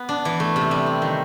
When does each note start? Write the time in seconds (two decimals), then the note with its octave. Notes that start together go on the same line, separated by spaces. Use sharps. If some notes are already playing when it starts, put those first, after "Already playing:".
Already playing: B3
0.09 D4
0.25 E3
0.40 A3
0.56 C3
0.71 G3
0.86 C4
1.02 D#3